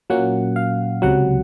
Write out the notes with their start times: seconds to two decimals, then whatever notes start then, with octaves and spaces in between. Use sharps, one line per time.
0.10 A#2 F#3 A#3 C#4 F#5
0.56 F5
1.02 C#2 C3 F#3 F#5